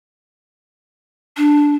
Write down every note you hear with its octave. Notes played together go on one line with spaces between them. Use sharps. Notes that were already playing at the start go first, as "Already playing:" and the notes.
D4